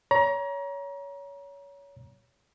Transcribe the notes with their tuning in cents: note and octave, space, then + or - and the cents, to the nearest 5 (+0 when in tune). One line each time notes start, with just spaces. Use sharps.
C#5 +25 A#5 +30